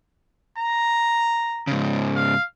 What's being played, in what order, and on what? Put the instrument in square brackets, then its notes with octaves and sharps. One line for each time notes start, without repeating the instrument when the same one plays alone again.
[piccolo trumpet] A#5
[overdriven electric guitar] G#2 C#3
[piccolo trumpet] F5